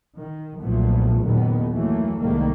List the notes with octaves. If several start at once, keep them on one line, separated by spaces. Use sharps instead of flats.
D#3
B1 A#2 F3 A3 B3
F#1 D#2 A#2 D#3 B3
E3 F#3 A3 A#3
C2 G#2 D#3 G3 A3 A#3